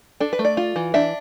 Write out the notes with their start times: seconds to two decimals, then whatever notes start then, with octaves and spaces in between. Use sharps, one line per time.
0.20 D4 A4
0.33 B4
0.39 A3
0.45 D5
0.57 F4
0.76 E3
0.94 D4 E5